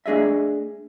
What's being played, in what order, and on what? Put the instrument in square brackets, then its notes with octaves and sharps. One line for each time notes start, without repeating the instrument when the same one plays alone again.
[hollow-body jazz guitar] A3 D4 G#4 D#5 E5